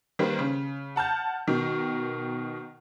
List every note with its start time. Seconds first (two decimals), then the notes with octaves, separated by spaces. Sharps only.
0.19 D#3 G3 A#3 B4 C5
0.39 C#3
0.96 F#5 A5 F6 G6
1.48 B2 D#3